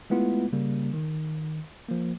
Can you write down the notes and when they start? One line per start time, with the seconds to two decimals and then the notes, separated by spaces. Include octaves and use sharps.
0.10 G#3 A3 B3 E4 F4
0.53 C#3 G3 A#3
0.94 D#3
1.88 F3 A#3